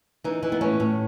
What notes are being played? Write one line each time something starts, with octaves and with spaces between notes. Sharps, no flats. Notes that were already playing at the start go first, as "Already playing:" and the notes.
E3 D#4
E3
B3
A2 C#4
A2